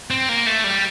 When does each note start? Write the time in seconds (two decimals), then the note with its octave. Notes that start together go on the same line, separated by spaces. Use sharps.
0.10 C4
0.29 A#3
0.46 A3
0.64 G3